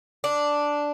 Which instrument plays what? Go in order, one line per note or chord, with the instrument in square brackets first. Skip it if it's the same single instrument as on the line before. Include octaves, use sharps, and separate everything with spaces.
[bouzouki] D4